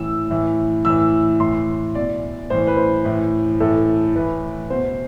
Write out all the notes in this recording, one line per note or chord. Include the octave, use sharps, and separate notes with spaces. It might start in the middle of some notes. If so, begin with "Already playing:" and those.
Already playing: A2 E3 E6
A2 E3
A2 E3 E6
A2 E3 C6
B2 D5
A2 E3 C5
B4
C5
A2 E3
A2 E3 A4
A2 E3 B4
B2 C5